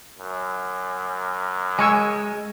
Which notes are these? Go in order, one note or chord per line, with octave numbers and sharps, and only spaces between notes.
F#2
G#3 G#5 C#6 E6